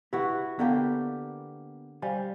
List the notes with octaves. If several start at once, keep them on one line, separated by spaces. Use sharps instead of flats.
E4 F#4 G4 B4
D3 A#3 B3 G4
G3 C5 F5 G#5